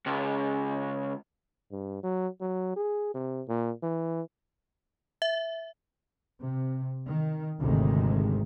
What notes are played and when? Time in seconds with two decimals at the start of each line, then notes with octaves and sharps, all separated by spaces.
0.07 C#2
1.72 G2
2.03 F#3
2.41 F#3
2.76 G#4
3.14 C3
3.48 A#2
3.82 E3
5.22 E5
6.40 C3
7.08 D#3
7.60 G#1 D2 G#2 C3 D#3 G#3